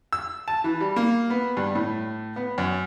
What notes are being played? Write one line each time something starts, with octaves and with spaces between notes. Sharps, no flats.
E6
A5
E3
G3
A#3
B3
G2
A2
B3
F#2